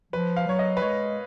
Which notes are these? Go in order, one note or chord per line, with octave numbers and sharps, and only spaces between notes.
F3 B4
F5
F#3 C#5
D#5
B4
G#3 C#5